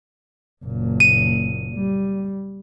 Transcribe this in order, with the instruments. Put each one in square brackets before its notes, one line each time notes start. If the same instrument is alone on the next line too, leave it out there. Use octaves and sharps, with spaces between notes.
[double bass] F#1 A#2
[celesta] D#7
[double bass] G3